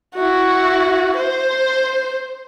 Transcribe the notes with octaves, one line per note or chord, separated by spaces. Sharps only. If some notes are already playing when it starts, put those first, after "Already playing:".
E4 F#4
C5